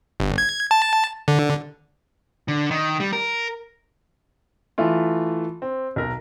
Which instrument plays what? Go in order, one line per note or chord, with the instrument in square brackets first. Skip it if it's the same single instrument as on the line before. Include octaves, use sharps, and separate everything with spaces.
[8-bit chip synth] G1
G#6
A5
D3
[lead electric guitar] D3
D#3
G3
A#4
[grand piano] E3 A3 F4
C4
B1 A#4